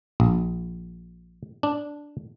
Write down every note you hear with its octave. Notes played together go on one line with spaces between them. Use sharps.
A#1
D4